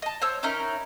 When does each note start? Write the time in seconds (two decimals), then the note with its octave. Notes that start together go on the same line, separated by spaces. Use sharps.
0.02 D#5 A5
0.21 C5 C#5 E6
0.43 C#4 D#4 E4 A#4